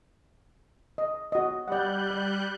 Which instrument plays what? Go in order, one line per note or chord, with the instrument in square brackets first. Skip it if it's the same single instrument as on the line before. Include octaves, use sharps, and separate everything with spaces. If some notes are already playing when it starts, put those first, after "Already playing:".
[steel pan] D#5
F#4 D#5
[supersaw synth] G3 F#6 G6 [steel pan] D5 F#5
[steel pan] D5